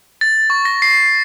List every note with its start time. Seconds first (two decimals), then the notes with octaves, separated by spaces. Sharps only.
0.21 A6
0.50 C#6
0.65 A#6
0.82 C7